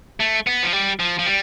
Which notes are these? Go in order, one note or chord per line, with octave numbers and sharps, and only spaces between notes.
A3
B3
F3
G3
F3
F3
G3